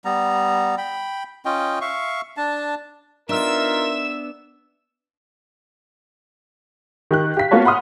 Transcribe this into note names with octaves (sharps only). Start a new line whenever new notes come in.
G3 B3 A#5
G5 B5
C#4 F4 D#5 G5
E5 F5 C#6
D4 A5
B3 D4 D#4 F4 A#4 E5 E6 E7
D#3 G4 F#6
G4 F5 B6
A#3 B3 F4 F#4 C#5 A5
F#5 B5 C6 D#6 F6